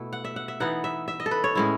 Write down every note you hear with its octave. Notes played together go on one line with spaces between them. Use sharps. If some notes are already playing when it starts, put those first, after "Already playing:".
Already playing: B2 A3 E4
F#5
E5
F#5
E5
E3 B3 D#4 F#5
E5
E5
D#5
A4
B4
C#5
A2 G#3 C#4 E4